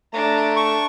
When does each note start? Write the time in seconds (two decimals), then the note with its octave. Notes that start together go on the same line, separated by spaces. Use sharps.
0.14 A3 D4 A#5
0.56 A5 C#6